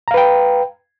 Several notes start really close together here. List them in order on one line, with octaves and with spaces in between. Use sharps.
A#5 F5 B4 G5